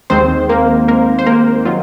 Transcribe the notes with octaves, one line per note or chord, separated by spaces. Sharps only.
D#2 D#3 G#3 C4 C5
A#3 A#4
A#3 A#4
C5
A#3 A#4
D#3 F#3 F4